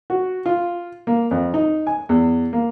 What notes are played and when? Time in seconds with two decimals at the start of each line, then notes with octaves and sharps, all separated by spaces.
0.10 F#4
0.46 F4
1.07 A#3
1.31 F2
1.54 D#4
1.87 G#5
2.09 E2
2.53 A#3